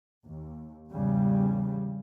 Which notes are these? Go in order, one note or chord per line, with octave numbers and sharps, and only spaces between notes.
D#2
G#1 E2 C#3 G3